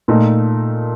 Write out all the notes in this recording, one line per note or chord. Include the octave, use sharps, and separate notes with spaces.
A#2 A3 D#4